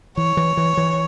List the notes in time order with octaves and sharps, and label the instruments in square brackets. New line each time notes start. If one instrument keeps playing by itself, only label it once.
[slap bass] E3 [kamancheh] C#5
[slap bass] E3
E3
E3